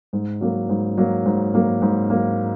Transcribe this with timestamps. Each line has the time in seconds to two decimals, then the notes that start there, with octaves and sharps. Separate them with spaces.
0.13 G#2
0.41 F#3 A#3
0.69 G#2
0.97 F#3 A#3
1.26 G#2
1.54 F#3 A#3
1.82 G#2
2.10 F#3 A#3